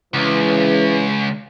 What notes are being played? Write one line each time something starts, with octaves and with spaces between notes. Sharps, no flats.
C#2 C#3 E3